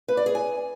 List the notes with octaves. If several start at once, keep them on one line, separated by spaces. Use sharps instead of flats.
B4
D5
G#4
G#5